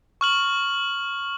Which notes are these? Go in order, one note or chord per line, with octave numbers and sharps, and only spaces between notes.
C#6 F6 F#7